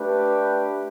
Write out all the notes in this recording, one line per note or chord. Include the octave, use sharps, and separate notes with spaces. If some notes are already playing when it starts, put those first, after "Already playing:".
Already playing: A3 D4 G4 B4